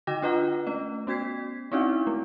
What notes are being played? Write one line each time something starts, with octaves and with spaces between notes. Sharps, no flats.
D3 F#4 D#5 G5 D6 A#6
D4 F4 B4 D#5 F#5 A#5
A3 C#4 D#5
B3 C#4 F#4 G#6 B6 C7
C4 C#4 D#4 E4 F#4 F#5
A3